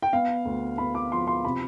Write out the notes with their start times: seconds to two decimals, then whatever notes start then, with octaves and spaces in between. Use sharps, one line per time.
0.02 G5
0.13 B3 F5
0.45 D2
0.78 B3 B5
0.95 D6
1.12 F3 C6
1.27 C6
1.45 C3 B5